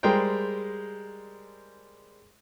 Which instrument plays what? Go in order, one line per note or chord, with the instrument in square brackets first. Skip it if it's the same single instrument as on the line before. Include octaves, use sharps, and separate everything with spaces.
[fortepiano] G3 G#3 G#4 A#4 C5 G5